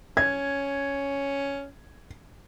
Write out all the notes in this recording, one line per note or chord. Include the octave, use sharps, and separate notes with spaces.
C#4 G#6